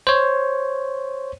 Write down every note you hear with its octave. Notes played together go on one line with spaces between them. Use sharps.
C5 C#5